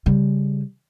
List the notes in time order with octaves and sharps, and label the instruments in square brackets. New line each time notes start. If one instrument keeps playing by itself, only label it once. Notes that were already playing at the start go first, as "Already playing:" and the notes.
[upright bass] C#3 G3